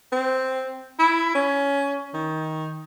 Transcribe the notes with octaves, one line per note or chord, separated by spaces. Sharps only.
C4
E4
C#4
D#3